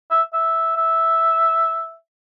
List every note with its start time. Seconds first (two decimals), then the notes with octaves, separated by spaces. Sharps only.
0.11 E5
0.33 E5
0.77 E5